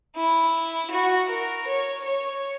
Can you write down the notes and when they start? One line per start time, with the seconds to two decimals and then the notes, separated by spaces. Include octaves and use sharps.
0.16 E4
0.91 F#4
1.29 A#4
1.67 C#5
2.05 C#5